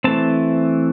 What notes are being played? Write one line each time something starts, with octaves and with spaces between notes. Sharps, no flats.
E3 A3 C4 A5